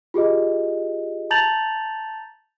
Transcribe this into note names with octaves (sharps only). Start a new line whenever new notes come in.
F4 G4 G#4 D#5
A5 A#5 G6 A6 F7 F#7